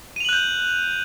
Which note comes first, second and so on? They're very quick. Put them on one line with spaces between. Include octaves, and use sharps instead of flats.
D#7 F7 F#7 F#6 G6